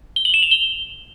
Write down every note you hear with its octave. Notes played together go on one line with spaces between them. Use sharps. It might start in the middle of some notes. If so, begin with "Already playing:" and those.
G7
F#7
E7
F7
G7